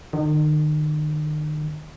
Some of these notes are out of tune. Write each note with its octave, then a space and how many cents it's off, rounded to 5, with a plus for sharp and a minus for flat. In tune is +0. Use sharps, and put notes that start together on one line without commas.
D#3 -40